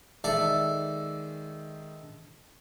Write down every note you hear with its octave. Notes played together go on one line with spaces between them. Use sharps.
D#3 G#3 A4 D5 E5